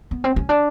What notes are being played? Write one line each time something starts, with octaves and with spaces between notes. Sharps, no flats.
B3
C4
C#4
D4